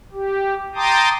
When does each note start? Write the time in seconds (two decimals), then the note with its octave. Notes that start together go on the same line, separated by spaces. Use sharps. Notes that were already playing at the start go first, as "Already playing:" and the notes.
0.13 G4
0.75 G5 A5 A#5 C6 D6 D#6